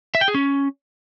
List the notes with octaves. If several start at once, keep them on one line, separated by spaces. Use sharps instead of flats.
E5
G5
G#4
C#4